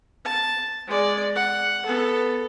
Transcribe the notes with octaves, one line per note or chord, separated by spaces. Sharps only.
A5
G#3 D5
F#5
B3 A4